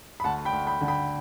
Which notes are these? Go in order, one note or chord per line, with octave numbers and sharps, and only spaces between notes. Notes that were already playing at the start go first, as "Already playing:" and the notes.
B5
D2 F#5 A5
G5 B5
D2
G5 B5
D3
G5 B5